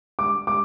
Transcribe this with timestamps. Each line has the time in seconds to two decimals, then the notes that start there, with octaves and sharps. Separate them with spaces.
0.19 D6
0.47 D6